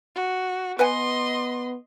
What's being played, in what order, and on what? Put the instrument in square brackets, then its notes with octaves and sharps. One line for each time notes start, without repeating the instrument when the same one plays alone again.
[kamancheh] F#4
[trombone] B3 [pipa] B4 F#5 G#5 [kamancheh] D#5 C6